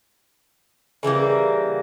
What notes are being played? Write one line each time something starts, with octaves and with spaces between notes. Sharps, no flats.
C#3 E3 G3 A#3